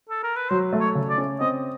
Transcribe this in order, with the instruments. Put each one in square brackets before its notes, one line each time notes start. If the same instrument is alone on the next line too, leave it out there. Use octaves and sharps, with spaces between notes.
[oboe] A4
A#4
B4
[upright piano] F#3 [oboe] C5
[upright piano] A3
[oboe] C#5
[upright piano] C#3
[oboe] D5
[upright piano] C#4
[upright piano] C4 [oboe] D#5